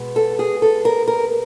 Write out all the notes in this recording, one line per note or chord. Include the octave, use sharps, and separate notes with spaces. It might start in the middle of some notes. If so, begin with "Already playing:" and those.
Already playing: B2 G#3 B3
A4
G#4
A4
A#4
A#4